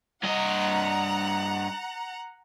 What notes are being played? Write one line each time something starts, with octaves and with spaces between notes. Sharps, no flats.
G2 D#5 F#5 A#5